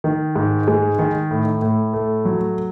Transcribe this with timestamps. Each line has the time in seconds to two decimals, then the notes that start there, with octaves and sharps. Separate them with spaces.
0.04 D#3
0.35 G#2
0.68 G#3
0.99 D#3
1.31 A2
1.62 A2
1.93 A3
2.25 F#3